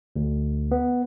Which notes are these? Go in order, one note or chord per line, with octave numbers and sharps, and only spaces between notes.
D2
B3